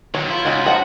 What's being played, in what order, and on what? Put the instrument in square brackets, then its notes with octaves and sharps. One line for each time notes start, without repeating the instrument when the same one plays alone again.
[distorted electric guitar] D3 D#3 [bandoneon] F#3 B3 [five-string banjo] C#5
[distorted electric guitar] E4 [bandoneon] F4 B5 G6
[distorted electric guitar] C#2 [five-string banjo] C#4 D#4 F#4
[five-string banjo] F3 A#5 [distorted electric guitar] F#4 [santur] F#5